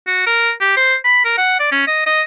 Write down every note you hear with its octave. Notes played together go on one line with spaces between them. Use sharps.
F#4
A#4
G4
C5
B5
A#4
F#5
D5
C#4
D#5
D#5